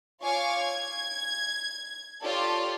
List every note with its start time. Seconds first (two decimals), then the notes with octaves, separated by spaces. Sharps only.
0.21 F4 C#5 F5 G#5 C#6 D6
0.58 G#6
2.24 F4 G4 A4 C#5 D5